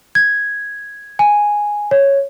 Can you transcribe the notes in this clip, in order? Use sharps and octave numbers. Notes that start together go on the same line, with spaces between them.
G#6
G#5
C#5